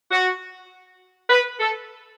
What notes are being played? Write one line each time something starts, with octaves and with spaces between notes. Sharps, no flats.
F#4
B4
A4